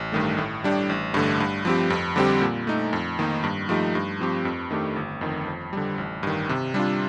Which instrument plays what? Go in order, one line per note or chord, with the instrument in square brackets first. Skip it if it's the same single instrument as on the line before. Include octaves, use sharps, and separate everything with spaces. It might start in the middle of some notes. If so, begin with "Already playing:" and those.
Already playing: [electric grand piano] A1
G2 D#3 A3
A2
G3 D4 G4
A1
G2 D3 A3
G2
F3 C4 G4
F2
D3 G3 C4 G4
A#2
A3 D#4
F2
D#3 A#3 D#4
G2
F3 A3 D#4 G4
G2
F3 C4 G4
F2
D#3 A3 D4 G4
G1
F2 D#3
F2
D3 G3
A1
G2 D#3
C3
G3 D4 F4